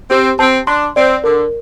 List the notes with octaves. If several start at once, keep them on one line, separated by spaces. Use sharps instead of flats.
C4 G4
C4 A5
D4 C6
C4 D5
D3 A#4